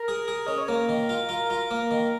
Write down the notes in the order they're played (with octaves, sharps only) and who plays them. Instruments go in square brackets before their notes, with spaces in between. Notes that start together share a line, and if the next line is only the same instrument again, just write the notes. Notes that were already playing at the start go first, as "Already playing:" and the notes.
Already playing: [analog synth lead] A#4
[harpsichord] G#4
G#4
[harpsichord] C#4 [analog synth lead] D#5
[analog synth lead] C#5
[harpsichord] A#3 [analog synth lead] A#4
[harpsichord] D#3
F4
F4
F4
A#3
D#3